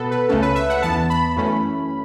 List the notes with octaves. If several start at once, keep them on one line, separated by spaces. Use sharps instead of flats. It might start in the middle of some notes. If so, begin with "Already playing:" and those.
Already playing: B2 B3 A4 B4
B4
C#2 C#3 A3 C#4 A4
B4
E5
F#5
E2 E3 B3 A5
B5
F#2 E3 A3 C#4